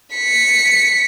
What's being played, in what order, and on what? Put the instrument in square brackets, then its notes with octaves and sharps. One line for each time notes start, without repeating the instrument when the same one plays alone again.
[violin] B6 C#7